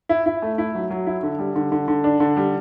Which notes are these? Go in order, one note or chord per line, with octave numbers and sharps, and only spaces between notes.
E4
E4
A3
E4
F#3
F#3
E4
D3
G3
D3
D3
D3
D4
D3
G3